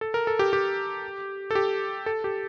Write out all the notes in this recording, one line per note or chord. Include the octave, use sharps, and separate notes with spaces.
A4
A#4
A4
G4
G4
A4
G4
A4
G4